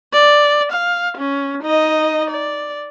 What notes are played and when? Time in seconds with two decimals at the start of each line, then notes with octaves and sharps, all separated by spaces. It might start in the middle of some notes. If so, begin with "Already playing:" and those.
0.13 D5
0.72 F5
1.17 C#4
1.63 D#4 D#5
2.30 D5